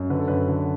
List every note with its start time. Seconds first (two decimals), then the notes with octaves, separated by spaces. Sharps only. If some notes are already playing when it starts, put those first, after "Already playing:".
Already playing: F#2
0.10 D3 B4
0.19 A4
0.28 F#2 B4
0.48 D3